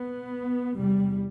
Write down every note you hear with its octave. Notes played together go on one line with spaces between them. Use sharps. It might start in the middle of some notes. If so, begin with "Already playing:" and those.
Already playing: B3
E2 C3 G3